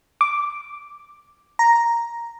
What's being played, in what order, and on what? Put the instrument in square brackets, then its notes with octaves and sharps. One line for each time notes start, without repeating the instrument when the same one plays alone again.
[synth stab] D6
A#5